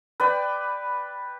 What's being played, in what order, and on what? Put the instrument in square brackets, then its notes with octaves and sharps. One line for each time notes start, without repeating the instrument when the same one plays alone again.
[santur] B4 D5 G5